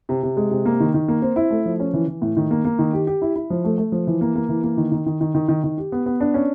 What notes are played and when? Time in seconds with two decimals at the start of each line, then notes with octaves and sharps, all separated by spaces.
0.09 C3
0.23 C3
0.37 G#3
0.51 C3
0.66 A#3
0.80 D#3
0.94 D#3
1.08 A#3
1.22 C4
1.36 E4
1.51 A3
1.66 F3
1.80 C#4
1.93 E3
2.08 E3
2.22 A2
2.37 D#3
2.51 A#3
2.65 A#3
2.79 D#3
2.93 G4
3.07 G4
3.22 E4
3.36 E4
3.50 F3
3.64 A3
3.78 A3
3.92 F3
4.07 E3
4.21 A#3
4.35 A#3
4.49 E3
4.64 A#3
4.77 D#3
4.92 D#3
5.06 D#3
5.21 D#3
5.35 D#3
5.49 D#3
5.64 D#3
5.78 G4
5.92 B3
6.06 B3
6.21 D4
6.34 C#4